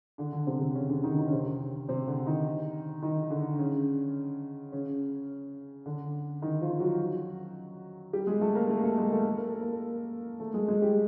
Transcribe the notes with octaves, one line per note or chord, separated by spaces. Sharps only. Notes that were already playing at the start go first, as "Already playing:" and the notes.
D3 D4
D3 D4
C3 C4
C3 C4
C#3 C#4
D3 D4
D#3 D#4
D#3 D#4
C#4
C3 C4
C3 C4
D3 D4
D#3 D#4
D#3 D#4
D3 D4
C#3 C#4
C#3 C#4
D3 D4
D#3 D#4
F3 F4
F#3 F#4
G3 G4
G#3 G#4
A3 A4
A#3 A#4
A3 A4
A3 A4
G#3 G#4
A3 A4
A#4
A4
A#3 A#4
A3 A4
G#3 G#4
G#3 G#4
G3 G4